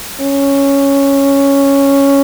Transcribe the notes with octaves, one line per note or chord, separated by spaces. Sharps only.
C#4